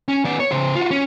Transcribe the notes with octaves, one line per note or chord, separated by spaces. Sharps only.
C#4
B3 D5
C#5
C#3 C5
F4 F#4
C#4